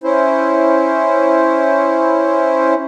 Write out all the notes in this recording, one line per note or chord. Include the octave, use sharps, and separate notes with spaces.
C#4 E4 C5